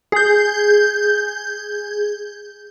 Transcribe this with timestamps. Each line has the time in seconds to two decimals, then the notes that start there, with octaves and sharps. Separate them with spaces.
0.12 G#4 G6